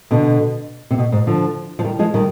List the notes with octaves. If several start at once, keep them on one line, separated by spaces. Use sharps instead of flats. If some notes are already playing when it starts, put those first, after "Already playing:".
B2 D3
C3
B2
G#2
D3 F3
F3
D#3 G3
F3 G#3
D#3 G3